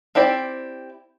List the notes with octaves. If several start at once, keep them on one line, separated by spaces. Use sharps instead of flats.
C4 E4 G4 D5